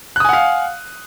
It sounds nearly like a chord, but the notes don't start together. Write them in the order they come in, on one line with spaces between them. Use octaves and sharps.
F#6 D#6 G#5 F#5 F5